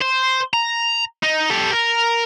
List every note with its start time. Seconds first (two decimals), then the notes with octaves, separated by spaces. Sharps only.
0.01 C5
0.53 A#5
1.23 D#4
1.50 G4 A4
1.72 A#4